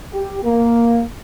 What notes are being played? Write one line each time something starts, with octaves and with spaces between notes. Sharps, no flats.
G4
A#3